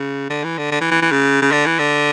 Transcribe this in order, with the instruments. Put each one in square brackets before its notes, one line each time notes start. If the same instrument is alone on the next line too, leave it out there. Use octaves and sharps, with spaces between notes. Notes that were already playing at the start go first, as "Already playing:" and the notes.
Already playing: [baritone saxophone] C#3
D3
E3
D3
D3
E3
E3
E3
C#3
C#3
D3
E3
D3